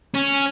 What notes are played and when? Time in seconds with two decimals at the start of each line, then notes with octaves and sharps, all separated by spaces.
0.14 C#4